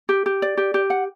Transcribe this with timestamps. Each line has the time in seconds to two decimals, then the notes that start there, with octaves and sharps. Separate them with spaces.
0.09 G4
0.26 G4
0.42 D5
0.57 G4
0.74 G4
0.90 F#5